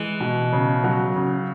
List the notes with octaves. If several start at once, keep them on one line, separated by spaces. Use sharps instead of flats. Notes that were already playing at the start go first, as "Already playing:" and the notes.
Already playing: E3 G#3
B2
C#3
F#3
C#3